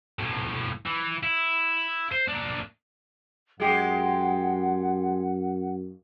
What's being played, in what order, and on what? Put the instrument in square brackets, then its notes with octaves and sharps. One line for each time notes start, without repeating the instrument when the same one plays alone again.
[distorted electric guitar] B1 A2
E3
E4
C5
A#3 D4
[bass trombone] F#2 [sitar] G#3 G4 [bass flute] F#5